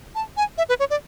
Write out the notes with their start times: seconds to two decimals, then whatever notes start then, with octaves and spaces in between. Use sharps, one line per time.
0.15 A5
0.37 G#5
0.58 E5
0.69 B4
0.80 C#5
0.90 D5